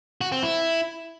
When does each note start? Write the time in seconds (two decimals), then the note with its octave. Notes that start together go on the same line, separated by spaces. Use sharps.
0.21 F#4
0.32 C4
0.43 E4